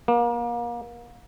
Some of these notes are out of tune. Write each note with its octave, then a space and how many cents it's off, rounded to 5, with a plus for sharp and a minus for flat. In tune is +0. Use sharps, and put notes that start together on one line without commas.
A#3 +30